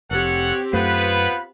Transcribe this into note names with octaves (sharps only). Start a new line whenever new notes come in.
F1 C4 G4 A4 C#5 F#5
F#2 A3 B3 F4 B4 C5 B5